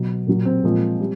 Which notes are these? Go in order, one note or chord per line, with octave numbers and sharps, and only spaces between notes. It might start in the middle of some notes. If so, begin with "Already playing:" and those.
Already playing: B2 F#3
A#2 F#3
C4
A#2 F3 G#3
G3